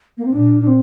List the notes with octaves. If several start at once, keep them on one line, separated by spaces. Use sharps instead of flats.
A#3
C4
A#2 D4
D4
C4